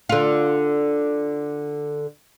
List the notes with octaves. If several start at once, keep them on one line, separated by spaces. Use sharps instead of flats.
D3 F4